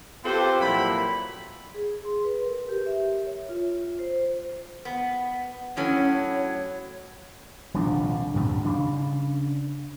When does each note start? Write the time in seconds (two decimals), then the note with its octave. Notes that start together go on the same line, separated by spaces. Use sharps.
0.24 C4 F4 G4 A4 B4 C5
0.60 A#2 F3 F#3 E4 B5
1.74 G#4
2.05 C6
2.24 B4
2.44 A#4
2.69 G4
2.86 E5
3.26 C#5
3.49 F4
3.75 F4
3.99 C5
4.85 B3
5.77 A2 F#3 C#4 C#5
7.74 D#1 C2 F3 D4
8.34 D2 G#2 G3
8.65 C#3 D4